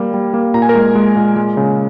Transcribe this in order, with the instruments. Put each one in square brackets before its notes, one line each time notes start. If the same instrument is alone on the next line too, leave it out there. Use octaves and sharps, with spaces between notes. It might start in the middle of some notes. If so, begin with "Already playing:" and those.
Already playing: [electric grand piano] G3 A#3
G3
A#3
A#2 A#5
G#5
A#4 A#5
G#3
G#3
A#2
G#3
C#3